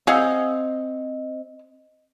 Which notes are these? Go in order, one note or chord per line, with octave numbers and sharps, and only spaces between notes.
C4 G#4 D#5 F5 F#5